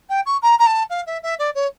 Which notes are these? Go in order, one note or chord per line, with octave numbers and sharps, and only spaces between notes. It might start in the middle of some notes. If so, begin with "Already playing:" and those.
G5
C#6
A#5
A#5
A5
F5
E5
E5
D5
C#5